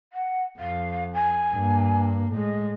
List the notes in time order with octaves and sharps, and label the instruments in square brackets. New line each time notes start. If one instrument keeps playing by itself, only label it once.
[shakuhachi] F#5
[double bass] F2 [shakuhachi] F5
[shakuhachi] G#5
[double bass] G2 A#3
[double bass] A2 G#3 [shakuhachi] D#5